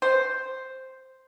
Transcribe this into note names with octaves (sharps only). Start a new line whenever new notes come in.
C5